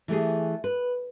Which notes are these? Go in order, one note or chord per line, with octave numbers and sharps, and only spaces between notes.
E3 A3 G4 G#4
B4